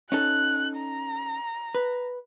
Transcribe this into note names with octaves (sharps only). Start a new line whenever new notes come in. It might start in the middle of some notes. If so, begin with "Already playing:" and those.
C#4 D#4 A4 F#6
A#5
B4